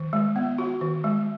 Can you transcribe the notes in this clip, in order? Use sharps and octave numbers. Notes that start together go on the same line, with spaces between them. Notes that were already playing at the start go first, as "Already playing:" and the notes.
Already playing: D#3
G#3
B3
F#4
D#3
G#3